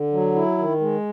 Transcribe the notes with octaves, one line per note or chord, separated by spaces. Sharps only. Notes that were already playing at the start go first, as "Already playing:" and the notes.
Already playing: D3
F#3
E4
D#3
G#3